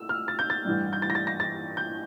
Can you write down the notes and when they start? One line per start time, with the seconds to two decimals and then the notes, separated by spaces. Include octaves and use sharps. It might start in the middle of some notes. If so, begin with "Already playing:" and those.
Already playing: C2 A3 E6
0.09 F6
0.28 A6
0.39 G6
0.50 A6
0.65 A1 G2 E3 G3
0.93 G6
1.02 A6
1.10 A#6
1.15 A6
1.27 A#6
1.40 A6
1.77 G6